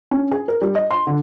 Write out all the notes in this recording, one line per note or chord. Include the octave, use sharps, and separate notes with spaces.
C#4
G#4
A#4
G3
D#5
C6
D3